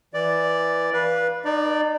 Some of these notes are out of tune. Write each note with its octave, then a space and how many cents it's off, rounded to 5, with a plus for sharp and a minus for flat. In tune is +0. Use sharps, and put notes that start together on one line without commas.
E3 +0 D5 +0
B4 -20 F5 +0
D#4 -35 D5 +0